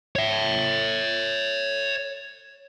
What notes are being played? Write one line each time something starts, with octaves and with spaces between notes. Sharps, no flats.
C#5 E5